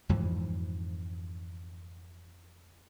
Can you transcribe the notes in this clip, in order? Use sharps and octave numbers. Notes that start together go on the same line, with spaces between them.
F2 G#2 E3 F3